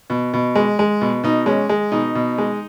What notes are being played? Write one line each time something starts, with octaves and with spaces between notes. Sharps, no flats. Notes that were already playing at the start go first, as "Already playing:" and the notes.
B2
B2
G#3
G#3
B2
B2 D#4
G#3 C#4
G#3
B2 D#4
B2
G#3